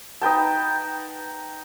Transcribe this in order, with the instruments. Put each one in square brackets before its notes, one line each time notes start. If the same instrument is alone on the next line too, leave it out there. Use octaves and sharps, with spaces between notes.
[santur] D#4 B4 G5 A5